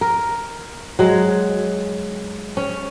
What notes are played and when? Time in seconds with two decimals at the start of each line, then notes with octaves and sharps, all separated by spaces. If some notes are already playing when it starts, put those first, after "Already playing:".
0.01 A#4
0.99 F#3 G#3
2.57 C#4